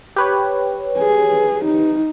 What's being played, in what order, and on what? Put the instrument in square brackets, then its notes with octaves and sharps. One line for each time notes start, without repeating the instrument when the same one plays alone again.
[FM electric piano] G4 B4 C#5
[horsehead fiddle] G#4
D#4